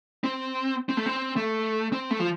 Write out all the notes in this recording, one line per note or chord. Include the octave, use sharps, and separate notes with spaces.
C4
C4
A3
C4
A3
C4
A3
F3